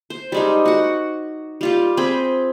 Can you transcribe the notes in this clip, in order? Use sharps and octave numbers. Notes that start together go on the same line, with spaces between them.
C5
G3 G#3 D#4
F#4 F#5
G3 F4 G4
C4 G#4 G5 B5